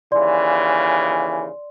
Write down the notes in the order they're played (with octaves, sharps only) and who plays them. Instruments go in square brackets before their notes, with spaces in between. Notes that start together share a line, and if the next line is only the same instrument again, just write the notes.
[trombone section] D#2 C#3 E3 [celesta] D5 C6